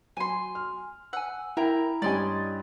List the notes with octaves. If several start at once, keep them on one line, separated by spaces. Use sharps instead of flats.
F#3 G#5 C6
F6
F#5 G#5 E6
E4 A#4 E5 G5 A#5 B5
G2 C#4 G4 D5 D#5 G#5 C6 A6